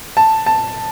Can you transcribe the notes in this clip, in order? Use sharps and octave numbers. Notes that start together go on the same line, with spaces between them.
A5
A5